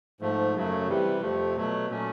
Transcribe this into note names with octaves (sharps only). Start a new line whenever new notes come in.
G#2 F3 A3
F#2 C#3 F#3 A3
C3 E3 G3
F2 C3 F3 A3
B2 F#3 A3
A#2 F#3 A3 C#4